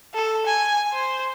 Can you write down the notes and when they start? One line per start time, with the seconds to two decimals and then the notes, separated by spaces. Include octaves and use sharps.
0.14 A4
0.46 G#5
0.92 C5